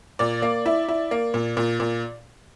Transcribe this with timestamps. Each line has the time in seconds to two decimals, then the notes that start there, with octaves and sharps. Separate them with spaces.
0.19 A#2 D5
0.42 A#3
0.66 E4
0.88 E4
1.11 A#3
1.34 A#2
1.57 A#2
1.80 A#2